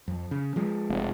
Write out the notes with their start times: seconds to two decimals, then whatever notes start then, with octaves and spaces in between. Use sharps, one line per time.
0.08 F2
0.31 C#3
0.56 F3 G#3
0.90 F1